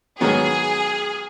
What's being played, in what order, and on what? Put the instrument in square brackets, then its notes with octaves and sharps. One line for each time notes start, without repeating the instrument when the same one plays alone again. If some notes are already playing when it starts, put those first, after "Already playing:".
[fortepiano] G#2 D#3 F#3 B3 [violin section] G#4